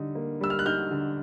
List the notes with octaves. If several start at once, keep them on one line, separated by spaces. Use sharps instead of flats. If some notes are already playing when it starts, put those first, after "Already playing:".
Already playing: D3 G3 D#4
A#3
G3 E6
F6
F#6
D#4 F6 G6
D3